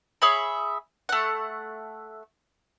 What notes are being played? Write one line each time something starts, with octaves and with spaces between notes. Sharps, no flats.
G#4 C#5 E5 B5
A3 F#5